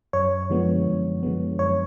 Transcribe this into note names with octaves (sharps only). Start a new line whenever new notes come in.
F#2 C#5
D3 F3 G#3 B3
F#2
D3 F3 G#3 B3
F#2 C#5